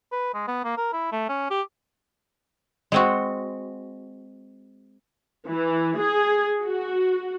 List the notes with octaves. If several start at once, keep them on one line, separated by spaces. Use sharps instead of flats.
B4
G#3
B3
A#3
A#4
E4
A3
C#4
G4
G#3 C4 F#4
E3
G#4
F#4